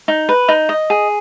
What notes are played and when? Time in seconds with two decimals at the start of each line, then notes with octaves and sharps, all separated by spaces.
0.08 D#4
0.29 B4
0.48 D#4
0.69 D#5
0.90 G#4